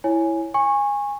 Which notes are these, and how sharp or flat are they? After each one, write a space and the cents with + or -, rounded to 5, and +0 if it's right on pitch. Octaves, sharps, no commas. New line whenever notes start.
E4 +0 C#5 +0 G#5 +0
G#5 -20 C#6 -20